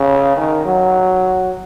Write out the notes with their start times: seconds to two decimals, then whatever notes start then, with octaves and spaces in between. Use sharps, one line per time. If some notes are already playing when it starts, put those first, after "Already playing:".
Already playing: C#3
0.37 D#3
0.65 F#3